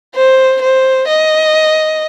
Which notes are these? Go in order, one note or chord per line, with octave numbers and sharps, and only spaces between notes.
C5
C5
D#5